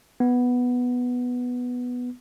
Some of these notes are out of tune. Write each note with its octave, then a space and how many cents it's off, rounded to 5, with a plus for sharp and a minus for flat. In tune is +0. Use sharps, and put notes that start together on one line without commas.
B3 +0